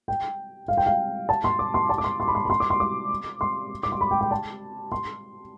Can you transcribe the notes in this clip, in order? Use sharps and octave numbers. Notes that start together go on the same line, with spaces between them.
G5
F5
G5
F5
A5
C6
D6
C6
A5
D6
C6
C6
B5
C6
B5
C6
D6
C6
D6
C6
D6
C6
B5
G5
G5
A5
C6